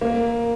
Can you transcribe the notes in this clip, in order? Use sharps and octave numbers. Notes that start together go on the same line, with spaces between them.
A#3